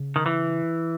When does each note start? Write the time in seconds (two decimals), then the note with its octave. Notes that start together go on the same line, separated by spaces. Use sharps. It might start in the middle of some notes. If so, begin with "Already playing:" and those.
Already playing: C#3
0.16 D#3
0.26 E3